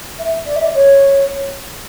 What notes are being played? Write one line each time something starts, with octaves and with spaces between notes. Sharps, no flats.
E5
D5
E5
D5
C#5